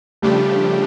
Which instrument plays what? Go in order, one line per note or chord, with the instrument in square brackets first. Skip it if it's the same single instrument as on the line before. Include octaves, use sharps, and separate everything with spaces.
[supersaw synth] C#3 F3 A3 D4 G4 [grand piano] G3